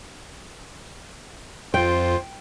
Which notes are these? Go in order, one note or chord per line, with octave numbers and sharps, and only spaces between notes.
F2 F4 C5 G5